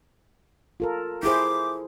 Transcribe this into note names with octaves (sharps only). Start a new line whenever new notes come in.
F4 A4 A#4
E4 G#4 C5 D6